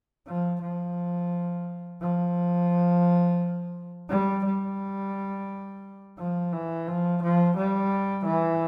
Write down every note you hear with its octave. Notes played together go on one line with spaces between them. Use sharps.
F3
F3
F3
G3
G3
F3
E3
F3
F3
G3
E3